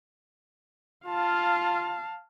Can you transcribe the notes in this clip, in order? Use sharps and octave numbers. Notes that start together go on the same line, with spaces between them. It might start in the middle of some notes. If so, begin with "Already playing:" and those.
F4 F5 A5